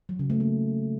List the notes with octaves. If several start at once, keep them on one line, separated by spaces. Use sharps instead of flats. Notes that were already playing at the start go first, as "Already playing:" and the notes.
F#3
C#3
A3
A#3